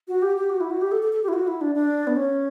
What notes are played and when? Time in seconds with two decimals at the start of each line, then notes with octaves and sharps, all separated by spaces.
0.08 F#4
0.22 G4
0.37 G4
0.50 F#4
0.60 E4
0.71 F#4
0.81 G4
0.92 A4
1.03 A4
1.13 A4
1.23 G4
1.28 E4
1.33 F#4
1.47 E4
1.61 D4
1.75 D4
2.07 B3
2.17 C#4